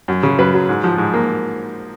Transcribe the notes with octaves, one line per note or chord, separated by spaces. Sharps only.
F#2
C#3
F#2 B4
F#3
G#2
F3
G#2
A#3